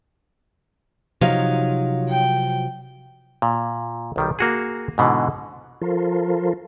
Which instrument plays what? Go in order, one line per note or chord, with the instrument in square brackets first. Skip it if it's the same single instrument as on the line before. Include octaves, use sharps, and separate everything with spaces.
[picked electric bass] C3 F3 F#3 [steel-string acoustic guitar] D#4 C#5 F5
[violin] G5
[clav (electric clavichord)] A#2
B1 D#3 G3
A#3 F#4 G#4
G#2 B2 D3 E3
[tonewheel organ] F3 F4 A4 A#4 C5